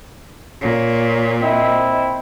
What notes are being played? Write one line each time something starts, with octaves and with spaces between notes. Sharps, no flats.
A#2 C#5
C4 E4 D#5